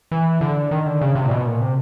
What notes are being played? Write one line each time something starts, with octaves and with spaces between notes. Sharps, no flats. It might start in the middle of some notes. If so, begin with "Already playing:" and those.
E3
D3
D#3
D3
C#3
C3
A#2
B2
A#2
C3